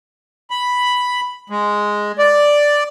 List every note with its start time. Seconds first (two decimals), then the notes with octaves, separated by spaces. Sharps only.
0.51 B5
1.50 G#3
2.19 D5